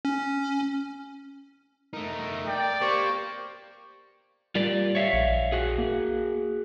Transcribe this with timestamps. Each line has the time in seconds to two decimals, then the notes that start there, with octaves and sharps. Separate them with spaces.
0.05 C#4
1.93 A3 D#4 A#4
2.47 D5 G5
2.81 A#3 G4 C5 C#6
4.55 G3 F4 A#4 D5
4.95 C#5 E5 F5
5.14 A#1
5.52 F#4 G#4
5.78 A#3